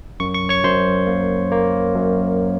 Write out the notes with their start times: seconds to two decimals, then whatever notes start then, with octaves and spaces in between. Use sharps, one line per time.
0.20 F#2 C#6
0.34 C#6
0.49 C#5 C#6
0.64 F#2 C5 C6
1.07 A#3
1.52 A#3
1.95 F#2